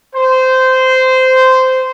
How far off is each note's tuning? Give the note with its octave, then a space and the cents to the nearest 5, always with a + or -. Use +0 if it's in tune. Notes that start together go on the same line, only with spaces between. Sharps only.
C5 -15